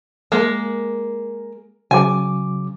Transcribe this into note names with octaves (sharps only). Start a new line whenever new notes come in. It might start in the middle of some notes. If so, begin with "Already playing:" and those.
G#3 A#3
C#3 F#3 G#5 D6